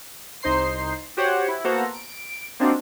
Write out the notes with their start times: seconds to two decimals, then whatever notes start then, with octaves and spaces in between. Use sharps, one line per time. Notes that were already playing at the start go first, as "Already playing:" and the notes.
0.42 C2 D#4 C5 C6 C7
1.17 F#4 G4 C5 C#5 F#5
1.48 E4
1.64 A#3 B3 F#4 A4 C5 A#5
1.94 D7
2.59 A#3 C4 D4 D#4 F4 F#4